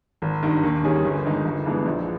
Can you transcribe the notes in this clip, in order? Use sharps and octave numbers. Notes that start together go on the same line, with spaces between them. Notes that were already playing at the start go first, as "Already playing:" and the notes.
G#1
G2 D#3
D#2
D#3 G3 C#4 G#4
G1
G2 D#3 G#3 D#4
G1
G2 E3 G#3 B3
A#1